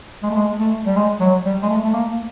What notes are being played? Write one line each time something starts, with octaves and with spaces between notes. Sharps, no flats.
G#3
A3
G#3
A3
G3
G#3
F#3
G3
G#3
A3
A3
A#3